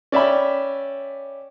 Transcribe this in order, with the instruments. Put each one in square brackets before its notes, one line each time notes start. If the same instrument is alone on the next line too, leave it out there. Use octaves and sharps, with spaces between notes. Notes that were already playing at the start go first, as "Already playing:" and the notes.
[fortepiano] C#4 D5 E5 G5 B5